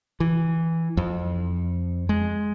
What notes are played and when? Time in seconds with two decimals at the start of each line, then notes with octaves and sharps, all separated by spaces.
0.20 E3
0.97 F2
2.09 G#3